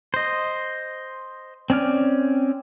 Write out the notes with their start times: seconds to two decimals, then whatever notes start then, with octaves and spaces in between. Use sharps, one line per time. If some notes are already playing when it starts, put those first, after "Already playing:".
0.14 C5 D#5
1.70 C4 C#4 D5 F6